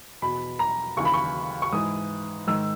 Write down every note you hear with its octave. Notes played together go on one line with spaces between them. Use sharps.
E2 B2 B5
A#5
D#2 C#3 E3 C#6
B5
C#6
C#6
G#2 E3 D#6
G#2 D#3 E6